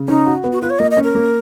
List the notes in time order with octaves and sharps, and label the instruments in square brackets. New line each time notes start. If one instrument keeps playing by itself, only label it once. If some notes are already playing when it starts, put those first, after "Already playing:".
Already playing: [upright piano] C#3
[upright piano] C#4 [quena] D#4
[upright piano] F#4
B3
[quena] F#4
[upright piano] F4 [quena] B4
[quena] C#5
[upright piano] A#3 [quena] D#5
[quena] D#5
[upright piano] C#4
[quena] A#4
[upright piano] A#3